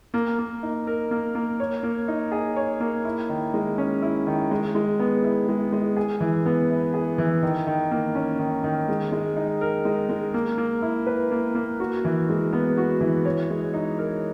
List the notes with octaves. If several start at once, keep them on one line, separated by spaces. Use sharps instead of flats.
A#3
A#3
D#4
A#4
A#3
A#3
C#5
A#3
D#4
G#4
C#5
A#3
E4
D#3
G#3
C#4
E4
D#3
G#3
G#3
B3
E4
G#3
G#3
G#4
E3
B3
E4
G#4
E3
D#3
D#3
A#3
C#4
D#3
D#3
G#3
G#3
D#4
A#4
G#3
G#3
A#3
A#3
E4
B4
A#3
A#3
F#4
E3
G#3
B3
F#4
E3
C#5
G#3
D#4
A#4